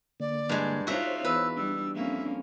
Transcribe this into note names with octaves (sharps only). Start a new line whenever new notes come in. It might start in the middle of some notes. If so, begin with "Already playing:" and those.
D3 A#3 D5
G2 G#3
D4 D#4 F4 F#4 C5 C#5 E5
E2 B4 E6
G3 D4 E6
F2 A#3 C#4 E5